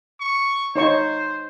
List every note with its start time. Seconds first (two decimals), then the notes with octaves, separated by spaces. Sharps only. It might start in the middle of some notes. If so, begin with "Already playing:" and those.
0.20 C#6
0.76 D#4 C5 C#5 C#6